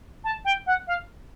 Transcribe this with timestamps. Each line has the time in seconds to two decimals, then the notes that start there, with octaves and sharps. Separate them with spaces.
0.24 A5
0.44 G5
0.66 F#5
0.87 F5